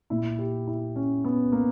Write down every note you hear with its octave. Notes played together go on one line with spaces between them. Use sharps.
A#2 E4
G4
E4
C#4
B3
A#3